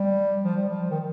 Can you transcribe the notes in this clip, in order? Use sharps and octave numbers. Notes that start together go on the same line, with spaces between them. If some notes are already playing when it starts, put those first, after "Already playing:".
Already playing: G3
F3
G3
F3
D#3